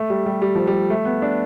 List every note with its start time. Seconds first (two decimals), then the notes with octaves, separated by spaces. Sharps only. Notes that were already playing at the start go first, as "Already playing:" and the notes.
Already playing: A3
0.10 G3
0.26 G3
0.42 G3
0.55 F3
0.67 G3
0.90 A3
1.05 B3
1.22 D4